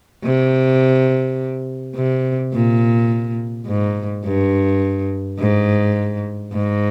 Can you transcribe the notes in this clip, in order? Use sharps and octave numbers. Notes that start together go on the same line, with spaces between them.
C3
C3
A#2
G#2
G2
G#2
G#2